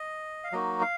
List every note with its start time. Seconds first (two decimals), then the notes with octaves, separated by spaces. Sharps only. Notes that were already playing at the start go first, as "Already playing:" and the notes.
Already playing: D#5
0.44 F5
0.52 F#3 A#3 D#4 F#4 D#5
0.82 F5